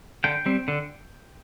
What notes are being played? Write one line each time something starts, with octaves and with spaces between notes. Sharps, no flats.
D3 G5
G3 C4
D3